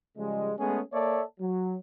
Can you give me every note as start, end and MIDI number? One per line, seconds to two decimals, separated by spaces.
0.17 0.52 49
0.17 0.52 53
0.17 0.52 55
0.17 0.52 56
0.58 0.81 56
0.58 0.81 57
0.58 0.81 59
0.58 0.81 61
0.58 0.81 68
0.93 1.23 58
0.93 1.23 69
0.93 1.23 73
0.93 1.23 74
0.93 1.23 76
0.93 1.23 81
1.40 1.77 54